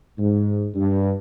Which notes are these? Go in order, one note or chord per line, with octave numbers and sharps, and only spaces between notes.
G#2
G2